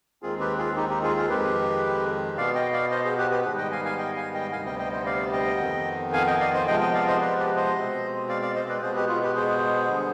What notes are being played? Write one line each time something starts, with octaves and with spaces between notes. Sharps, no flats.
D#2 D#3 G#3 C4 F4 G#4
G4 B4
F4 G#4
D#4 G4
D#4 G4
F4 G#4
F4 G#4
F2 D#3 G#3 G4 B4
B2 B3 D5 F5
D#5 G5
D5 F5
C5 D#5
G#4 C5
G4 B4
G4 B4
G#2 D#3 G3 B3 G#4 C5
D#5 G5
F5 G#5
F5 G#5
D#5 G5
F5 G#5
D#5 G5
D2 C3 G3 B3 F5 G#5
D#5 G5
D#5 G5
C5 D#5
D5 F5
D#5 G5
F2 D#3 B3
F5 G#5
D#5 G5
D5 F5
C5 D#5
C3 F3 G#3 B3 D#5 G5
D#5 G5
D5 F5
C5 D#5
B4 D5
G4 B4
C5 D#5
B2 G#3 C4
D5 F5
D5 F5
C5 D#5
B4 D5
B2 G#3 B3 G#4 C5
G4 B4
F4 G#4
G4 B4
G#4 C5
D3 G3 B3